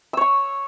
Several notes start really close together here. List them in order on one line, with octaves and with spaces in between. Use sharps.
E6 C#5 C#6